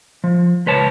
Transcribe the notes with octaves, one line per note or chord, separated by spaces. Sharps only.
F3
C#2 B4 C#5 A5